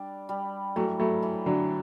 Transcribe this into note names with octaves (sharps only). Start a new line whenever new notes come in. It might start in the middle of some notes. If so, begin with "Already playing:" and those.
Already playing: G3 D4
G3
E3 F#3 A3
F#3 A3
E3
D3 F#3